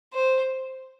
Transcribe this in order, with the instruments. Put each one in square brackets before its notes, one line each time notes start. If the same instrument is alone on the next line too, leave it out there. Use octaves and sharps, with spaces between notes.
[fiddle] C5